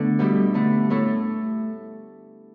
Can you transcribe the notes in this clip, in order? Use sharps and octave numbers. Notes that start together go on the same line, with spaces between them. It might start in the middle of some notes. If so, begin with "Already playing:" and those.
Already playing: D3 A3 B3 D4
B2 G3 E4 G4
D3 A3 E4
A2 A3 E4 A4